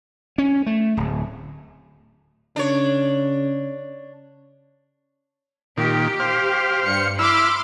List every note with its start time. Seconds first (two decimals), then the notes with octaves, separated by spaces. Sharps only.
0.38 C#4
0.66 A3
0.97 D1
2.56 C#3 D4 C#5
5.78 A#2 D#3 G4
6.20 C5 F5
6.85 G2 C#7
7.19 E4 B5 C6 D6 E6 F6